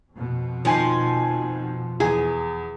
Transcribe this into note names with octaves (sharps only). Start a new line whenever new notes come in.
F2 B2
D#3 F3 G#5 C7
E2 G#4